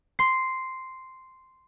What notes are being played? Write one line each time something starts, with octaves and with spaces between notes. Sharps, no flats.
C6 C7